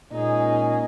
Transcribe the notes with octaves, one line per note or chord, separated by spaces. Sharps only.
A#2 G#3 C#4 D#4 G#4